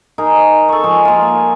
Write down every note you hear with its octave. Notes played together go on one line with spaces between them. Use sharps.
D#4 G#4 A#4
A4 C#6
F3 G#3 G#4
A#3 F4
G#5